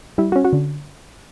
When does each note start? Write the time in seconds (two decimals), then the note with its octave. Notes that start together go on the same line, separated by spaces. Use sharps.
0.18 G3 E4
0.32 F#4
0.36 C#4
0.45 F#4
0.53 D3